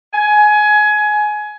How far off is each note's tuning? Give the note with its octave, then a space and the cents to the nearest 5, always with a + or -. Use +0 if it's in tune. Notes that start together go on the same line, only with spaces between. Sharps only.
G#5 +20